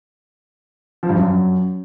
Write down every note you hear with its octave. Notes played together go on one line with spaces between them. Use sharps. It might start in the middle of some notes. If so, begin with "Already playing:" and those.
F3
G2
F#2